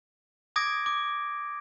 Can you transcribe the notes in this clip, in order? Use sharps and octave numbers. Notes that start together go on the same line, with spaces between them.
D6 D#6 G#6 A#6 D7
D6